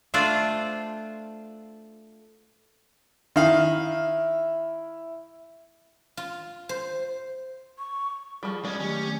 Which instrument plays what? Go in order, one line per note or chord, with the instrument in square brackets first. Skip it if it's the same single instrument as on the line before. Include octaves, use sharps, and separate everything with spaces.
[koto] A3 D4 F4 C5 D5
[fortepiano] D#3 F5 [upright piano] E4
[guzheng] F4
C5
[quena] C#6
[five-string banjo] F3 G3 [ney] G#4
[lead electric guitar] G#3 C#4 [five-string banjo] D5
[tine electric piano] D#3 F#3 A3 [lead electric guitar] C#4 [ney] G4